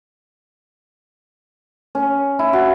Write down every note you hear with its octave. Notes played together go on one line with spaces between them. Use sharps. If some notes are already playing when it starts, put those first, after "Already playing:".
C#4
E4
F#4